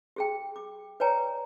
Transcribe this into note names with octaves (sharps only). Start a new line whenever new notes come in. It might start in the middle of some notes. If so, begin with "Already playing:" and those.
G4 G#4 G5
D6
B4 C#5 D5 G5 G#5 A#5